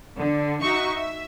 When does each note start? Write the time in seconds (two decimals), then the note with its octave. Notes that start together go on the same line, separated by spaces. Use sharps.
0.19 D3
0.61 D#4 F#4 E5 C#6
0.95 E5